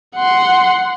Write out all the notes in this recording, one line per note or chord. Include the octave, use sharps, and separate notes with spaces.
F#5 C6